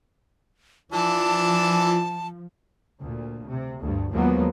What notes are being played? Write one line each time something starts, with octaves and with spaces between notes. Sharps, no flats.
E3 F3 D4 F4 A5
D2 A#2
C3
D2 G2
D#2 F3 F#3 G#3 A#3 B3